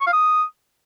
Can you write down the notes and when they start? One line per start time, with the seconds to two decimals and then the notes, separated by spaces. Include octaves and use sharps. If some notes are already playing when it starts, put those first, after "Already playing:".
0.01 C#6
0.07 F5
0.13 D#6